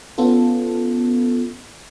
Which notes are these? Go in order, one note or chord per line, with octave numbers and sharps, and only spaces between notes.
B3 C#4 F4 A4